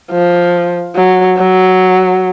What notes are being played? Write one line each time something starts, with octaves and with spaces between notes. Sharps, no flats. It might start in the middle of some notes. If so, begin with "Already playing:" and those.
F3
F#3
F#3